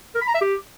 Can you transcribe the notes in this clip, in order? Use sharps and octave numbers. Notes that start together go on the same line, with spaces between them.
A#4
B5
A#5
E5
G4